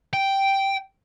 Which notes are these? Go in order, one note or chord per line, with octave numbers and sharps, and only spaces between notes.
G5